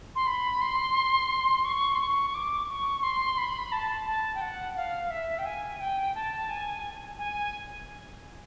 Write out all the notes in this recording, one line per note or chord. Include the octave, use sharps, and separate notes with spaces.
C6
B5
C6
C#6
C6
C#6
C#6
D6
C#6
C6
B5
A5
A5
G5
F#5
F5
E5
G5
G#5
G5
A5
G#5
G#5